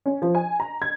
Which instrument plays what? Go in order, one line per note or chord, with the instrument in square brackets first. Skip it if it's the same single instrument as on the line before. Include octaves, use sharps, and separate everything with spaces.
[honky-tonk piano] C#4
F3
G#5
A#5
G#6